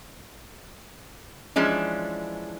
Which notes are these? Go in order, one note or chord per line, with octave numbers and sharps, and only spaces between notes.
E3 F3 G#3 C#4 D4